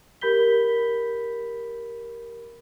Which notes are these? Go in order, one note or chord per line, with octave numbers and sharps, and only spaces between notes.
G4 A#4 B5 G6 B6 G7